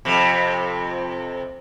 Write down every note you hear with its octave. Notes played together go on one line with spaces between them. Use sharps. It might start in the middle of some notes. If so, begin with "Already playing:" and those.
F2 C3